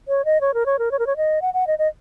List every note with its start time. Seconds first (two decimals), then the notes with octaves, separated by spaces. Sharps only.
0.08 C#5
0.25 D#5
0.41 C#5
0.54 A#4
0.66 C#5
0.79 A#4
0.91 C#5
0.99 A#4
1.07 C#5
1.17 D#5
1.42 F#5
1.54 F#5
1.67 D#5
1.79 D#5